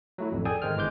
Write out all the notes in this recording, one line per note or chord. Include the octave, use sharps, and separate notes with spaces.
F#3 A3 E4
A1 F2
G#4 A4 D5 G5 G#5
G#2 D#3 G#3 C5 G5 F6
G1 E3 G#3 D6 G6